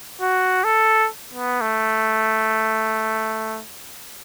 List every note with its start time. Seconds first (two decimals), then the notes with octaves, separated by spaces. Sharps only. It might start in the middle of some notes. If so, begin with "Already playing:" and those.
0.21 F#4
0.64 A4
1.34 B3
1.61 A3